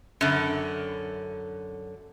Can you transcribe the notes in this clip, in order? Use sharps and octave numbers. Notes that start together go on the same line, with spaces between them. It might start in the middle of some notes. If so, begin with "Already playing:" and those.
F#2 D3